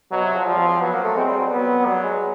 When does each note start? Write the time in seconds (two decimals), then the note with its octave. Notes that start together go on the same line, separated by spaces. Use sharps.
0.11 B2 F#3
0.23 C3
0.34 F3
0.46 F3 G3
0.58 C4
0.69 C4
0.81 F#3 B3
0.93 A#3
1.04 A3
1.16 G#3 C4
1.28 G3
1.39 F#3
1.48 G3 B3
1.57 F#3
1.86 F#3 G3
2.03 G#3